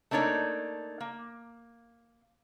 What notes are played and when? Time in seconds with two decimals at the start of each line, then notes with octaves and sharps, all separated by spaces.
0.11 A3 A#3 D4 D#4 C#5
1.00 A#3